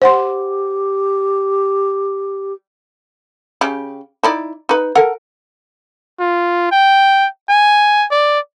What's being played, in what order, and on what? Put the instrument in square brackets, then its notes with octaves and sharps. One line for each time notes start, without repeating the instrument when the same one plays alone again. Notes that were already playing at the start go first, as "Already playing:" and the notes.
[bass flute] G4 [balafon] C5 F#5 C6
[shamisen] C#3 G4
D#4 E4 D5
D#4 B4
A4 A#4 F#5
[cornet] F4
G5
G#5
D5